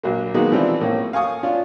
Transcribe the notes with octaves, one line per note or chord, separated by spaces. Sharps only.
A#1 F#3 A#3
D#3 F#3 G#3 A#3 B3 D#4
E3 F3 G3 C4 E4
A2 A#3 C#4
F5 G#5 C#6 D#6
C#4 D4 F4